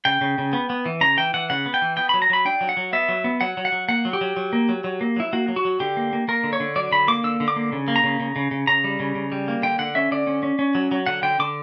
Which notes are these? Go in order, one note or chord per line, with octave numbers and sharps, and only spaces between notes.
C#3 G5
C#3
C#3
B3
B3
E3
C#3 A#5
E3 G5
E3 F#5
C#3 F#5
B3
G5
E3
B3 G5
F#3 B5
A#5
F#3 B5
D4 G5
F#3
F#5
F#3
B3 E5
F#3
B3
F#3 F#5
F#3
F#5
F#3
A#3 F#5
F#3
G4
F#3
F#3
A#3
F#3
F#3
A#3
F#3 E4
A#3 F#4
F#3
F#4
F#3
D3 G4
A#3
A#3
A#3 A#4
D3
C#5
D3
F#3 D5
D3 B5
A#3 D6
D3 E6
D3
D6
A#3
C#3
A#3
A#5
C#3
C#3
C#3
C#3
C#3 A#5
G3
C#3
C#3
G3
A#3
D3 G5
D3 F#5
C#4 E5
D3 D5
C#4
C#4
C#4
F#3
F#3
D3 F#5
D3 G5
D3 D6